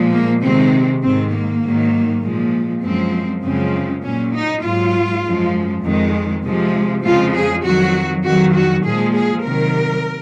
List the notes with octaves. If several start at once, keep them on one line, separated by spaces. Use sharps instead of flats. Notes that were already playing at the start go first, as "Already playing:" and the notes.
Already playing: A#2 F3 G#3
A#3
C3 D#3 G#3 C4
G#2 D#3 G#3 C4
A#3
G#2 D#3 F#3
A#2 F3 G#3
F#2 F3 G#3 C4
F#2 C#3 F3 G#3 C4
A#2 F#3 C#4
D#4
G#2 F#3 F4
F#2 F3 G#3
F2 D#3 G#3
C3 F3 G#3
F2 C#3 F3 G#3 F4
G#4
F2 D#3 F#3 F#4
F2 D#3 F#3 F#4
F#4
A#2 F3 G#3 G#4
G#4
C3 D#3 F#3 A#4